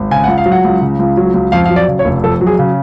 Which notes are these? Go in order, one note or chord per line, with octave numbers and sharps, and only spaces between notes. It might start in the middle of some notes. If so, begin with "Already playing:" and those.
Already playing: G#1
C#3 G#5
C#2 F#5
F5
F#3
F#5
C#2
C#3
C#2
F#3
C#2
F2 F5
F#3 F5
D5
C#3
C#5
F1
F2 A4
F#3
G#4
C#3